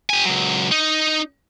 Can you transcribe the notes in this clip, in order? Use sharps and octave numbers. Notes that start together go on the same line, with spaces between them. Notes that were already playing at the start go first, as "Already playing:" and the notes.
G4 G#5
C#2 F#3
D#4